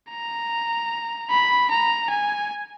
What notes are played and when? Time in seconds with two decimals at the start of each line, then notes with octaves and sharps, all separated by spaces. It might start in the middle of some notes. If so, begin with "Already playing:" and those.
0.11 A#5
1.30 B5
1.70 A#5
2.09 G#5